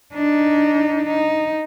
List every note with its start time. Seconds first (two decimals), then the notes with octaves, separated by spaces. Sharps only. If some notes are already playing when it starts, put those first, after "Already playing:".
0.14 D4 D#4
1.07 D#4